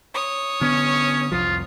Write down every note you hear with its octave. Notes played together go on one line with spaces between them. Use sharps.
C#5 D#6
D3 B3 C#4
C2 F2 F3 F4